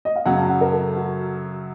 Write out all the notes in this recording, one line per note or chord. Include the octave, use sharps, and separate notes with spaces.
D#5
F5
F#2 C#3 F#3 F#5
A5
F#5
A#4
A4
F#4